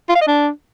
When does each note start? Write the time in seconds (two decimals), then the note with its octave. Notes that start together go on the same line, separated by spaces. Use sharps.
0.09 F4
0.15 F5
0.21 D#5
0.27 D4